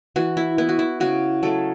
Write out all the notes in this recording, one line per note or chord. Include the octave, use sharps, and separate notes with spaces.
E3 F#4
E4
B3 E4
F#4
E4
C#3 F#4
F#3 A3 A4